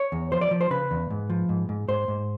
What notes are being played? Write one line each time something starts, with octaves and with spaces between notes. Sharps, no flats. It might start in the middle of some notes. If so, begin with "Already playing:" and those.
Already playing: C#5
E2
F3 C5
D5
F3
C5
C#3 B4
E2
G#2
F3
G#2
G#2
G#2 C5
G#2